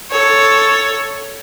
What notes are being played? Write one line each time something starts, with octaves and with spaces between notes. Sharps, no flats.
A4 C#5